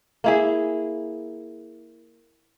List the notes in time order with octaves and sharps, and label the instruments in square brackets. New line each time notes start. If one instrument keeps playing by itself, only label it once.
[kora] A#3 E4 G#4